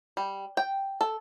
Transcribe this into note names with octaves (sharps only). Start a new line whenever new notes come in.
G3
G5
A4